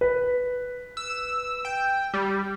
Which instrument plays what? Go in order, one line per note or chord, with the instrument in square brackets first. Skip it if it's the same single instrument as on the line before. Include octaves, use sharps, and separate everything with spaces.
[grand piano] B4
[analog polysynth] E6
G5
G3